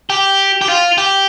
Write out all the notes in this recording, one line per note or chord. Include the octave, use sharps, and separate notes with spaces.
G4
G4
F4
G4